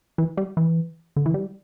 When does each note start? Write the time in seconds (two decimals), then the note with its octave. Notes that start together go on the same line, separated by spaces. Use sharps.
0.18 E3
0.37 G3
0.57 E3
1.16 D3
1.26 E3
1.34 G3